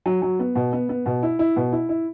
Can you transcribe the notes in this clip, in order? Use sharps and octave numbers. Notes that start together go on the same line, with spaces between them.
F#3
F#3
B3
B2
B3
B3
B2
E4
E4
B2
E4
E4